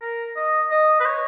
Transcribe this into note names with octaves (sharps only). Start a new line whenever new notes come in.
A#4
D#5
D#5
B4
C#5